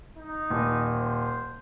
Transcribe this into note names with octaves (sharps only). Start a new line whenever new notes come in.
D#4
D#1
C5